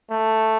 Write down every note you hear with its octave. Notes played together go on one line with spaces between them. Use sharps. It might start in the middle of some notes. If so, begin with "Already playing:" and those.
A3